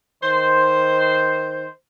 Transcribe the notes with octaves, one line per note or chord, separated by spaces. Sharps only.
D#3 C5